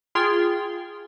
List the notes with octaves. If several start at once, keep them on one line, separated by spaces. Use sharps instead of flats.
F4 G#4 G5 C6